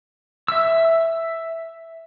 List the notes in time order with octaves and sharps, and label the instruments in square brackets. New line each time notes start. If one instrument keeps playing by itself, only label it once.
[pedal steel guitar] E5 E6